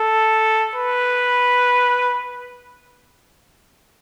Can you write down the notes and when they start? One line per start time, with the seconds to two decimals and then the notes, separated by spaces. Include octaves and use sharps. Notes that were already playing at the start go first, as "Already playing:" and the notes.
Already playing: A4
0.75 B4